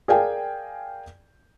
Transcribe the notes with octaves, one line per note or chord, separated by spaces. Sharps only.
G#4 A#4 D5 F5 G5 G#5